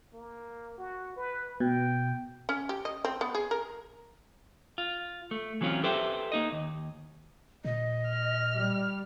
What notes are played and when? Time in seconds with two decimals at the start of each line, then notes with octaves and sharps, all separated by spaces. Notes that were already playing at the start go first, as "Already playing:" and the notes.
0.13 A#3
0.78 F#4
1.16 B4
1.60 B2 G5
2.49 C#4
2.69 G4
2.85 D#5
3.05 C4
3.21 B3
3.35 G#4
3.51 A#4
4.78 F4
5.31 A3
5.61 E3 F#3 C4 C#4 F4
5.84 G4 A4 B4 C5 E5 G5
6.32 A#3 D#4 D#5
6.52 D#2
7.65 A#2 D#5
8.09 F6
8.53 G3